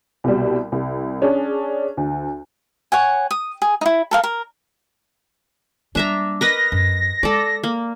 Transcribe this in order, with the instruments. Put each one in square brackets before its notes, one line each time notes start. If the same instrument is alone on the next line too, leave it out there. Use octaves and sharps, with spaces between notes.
[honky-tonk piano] C2 B2 G3
C2
C#4 D4 G#4
D2
[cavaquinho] C#5 F#5 G#5
D#6
G#4
D#4 E4
A4 A#4 F5
A#4
[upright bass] G3 A#3 [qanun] D4 E5 A#5
[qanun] A#4 B4 D#5 [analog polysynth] A#6
[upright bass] F#2
[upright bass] G#3 [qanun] A4 D5
[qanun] A#3